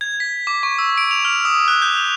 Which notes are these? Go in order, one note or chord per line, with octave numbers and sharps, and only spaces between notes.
G#6
B6
D6
C#6
E6
D7
F7
F6
D#6
F#6
G6
F7